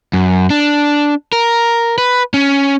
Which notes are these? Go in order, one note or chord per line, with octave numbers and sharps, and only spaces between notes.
F#2
D4
A#4
B4
C#4